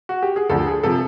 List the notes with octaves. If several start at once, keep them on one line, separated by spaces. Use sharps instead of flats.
F#4
G4
G#4
D2 D3 F3 A4
G#4
C3 F3 A4